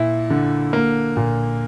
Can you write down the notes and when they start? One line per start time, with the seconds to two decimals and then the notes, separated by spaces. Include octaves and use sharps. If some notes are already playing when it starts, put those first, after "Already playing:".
Already playing: A#2 E4
0.30 D3
0.73 A#3
1.17 A#2